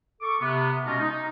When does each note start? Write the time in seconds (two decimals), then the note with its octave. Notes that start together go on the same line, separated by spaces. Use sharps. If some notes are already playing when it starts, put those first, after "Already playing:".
0.22 A4 C#6 D6
0.41 C3 B3
0.86 B2 G#3 C#4 D#4 F4 A#5
0.99 D#4